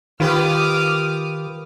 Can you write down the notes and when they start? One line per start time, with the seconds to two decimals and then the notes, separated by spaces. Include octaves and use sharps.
0.20 D#3 F4 G4 B4 D6 D#6 F6